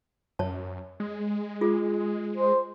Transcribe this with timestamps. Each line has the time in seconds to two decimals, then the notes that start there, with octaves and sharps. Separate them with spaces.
0.39 F#2 C#5 A5
1.00 G#3
1.61 F4 G#4
2.37 C5